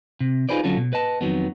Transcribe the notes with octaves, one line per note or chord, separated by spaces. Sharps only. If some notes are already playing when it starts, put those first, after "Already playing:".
C3
D#4 F4 G#4 B4 C5 D5
D3 F#3 C#4 F4 A4
B2
B4 D#5 A5
F2 D#3 F#3 B3